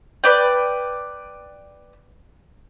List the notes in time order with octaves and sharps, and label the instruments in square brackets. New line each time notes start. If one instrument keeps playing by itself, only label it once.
[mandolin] B4 D5 G5